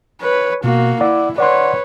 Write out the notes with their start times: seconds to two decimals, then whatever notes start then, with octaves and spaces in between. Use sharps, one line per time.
0.22 B4 C#5
0.64 B2 A#3 F#4
1.01 E4 D5 F#5 D6
1.38 B4 C#5 D5 F#5 C6